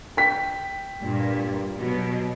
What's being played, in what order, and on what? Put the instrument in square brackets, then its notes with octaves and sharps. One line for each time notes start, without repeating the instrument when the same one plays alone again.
[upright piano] G5 B6
[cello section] G2 A#2
B2 F#3